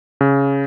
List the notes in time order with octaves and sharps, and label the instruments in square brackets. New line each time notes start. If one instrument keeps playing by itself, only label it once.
[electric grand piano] C#3